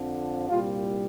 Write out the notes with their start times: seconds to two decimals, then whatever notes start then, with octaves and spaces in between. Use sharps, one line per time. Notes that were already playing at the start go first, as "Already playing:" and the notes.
Already playing: F2 D3 F3
0.49 C2 A#2 G3 F4